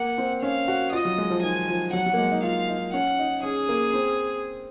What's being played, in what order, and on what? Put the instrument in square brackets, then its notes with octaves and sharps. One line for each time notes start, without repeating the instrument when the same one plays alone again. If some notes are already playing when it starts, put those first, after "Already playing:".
Already playing: [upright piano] A#3 [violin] F#5
[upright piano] C4
[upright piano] C#4 [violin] F5
[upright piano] F#4
[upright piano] F4 [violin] D#5
[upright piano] F#3
G#3
F3
[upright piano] D#3 [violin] G#5
[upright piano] F3
[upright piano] F#3 [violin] F#5
[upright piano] F#3
A#3
G#3
D#4
[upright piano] F4 [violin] F5
[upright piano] D#4
[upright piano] C#4 [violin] F#5
[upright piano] D#4
[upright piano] C#4 [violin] G#4
[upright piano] A#3
C4